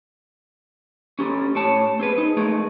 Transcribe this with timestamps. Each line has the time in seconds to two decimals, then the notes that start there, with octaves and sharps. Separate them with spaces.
1.19 C#4 G4 A4
1.55 A2 C#5 A5
1.99 C4 G#4 B4
2.18 D#4
2.37 A3 G#4 A#4